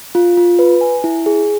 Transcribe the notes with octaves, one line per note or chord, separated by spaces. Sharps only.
F4
F4
B4
G#5
E4
G#4